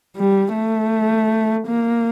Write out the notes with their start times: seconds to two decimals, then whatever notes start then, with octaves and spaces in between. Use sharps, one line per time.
0.17 G3
0.55 A3
1.68 A#3